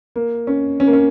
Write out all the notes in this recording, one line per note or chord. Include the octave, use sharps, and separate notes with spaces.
A#3
C#4
C#4
A#3
C#4